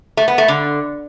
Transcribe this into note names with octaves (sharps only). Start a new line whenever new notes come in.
A3
B3
A3
D3